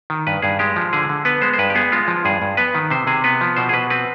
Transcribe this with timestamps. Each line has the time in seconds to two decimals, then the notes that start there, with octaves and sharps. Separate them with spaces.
0.10 D#3
0.27 G2 B4
0.42 G2 G#4
0.59 G#3 G4
0.76 F3
0.93 D3 G#4
1.09 D3
1.25 B3 B4
1.42 G#3 C5
1.53 C5
1.59 G2 B4
1.70 G4
1.75 B3 G#4
1.92 G#3 F4
2.08 F3
2.25 G2 G#4
2.42 G2
2.57 B3 B4
2.75 D#3
2.90 C3 C5
3.07 C3 G#4
3.24 B3 B4
3.41 F3
3.56 B2 C5
3.69 G#4
3.73 B2 B4
3.90 C4 B4